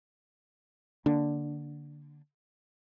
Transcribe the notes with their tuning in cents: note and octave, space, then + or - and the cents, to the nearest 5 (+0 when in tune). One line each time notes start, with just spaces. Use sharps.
D3 +0 A#3 +0 D4 +0